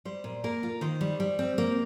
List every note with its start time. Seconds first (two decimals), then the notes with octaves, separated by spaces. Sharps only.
0.05 G3 C5
0.24 A#2
0.44 A#3 A#4
0.63 F4
0.81 D#3 C5
1.01 G3
1.20 G3
1.39 C4
1.58 A#3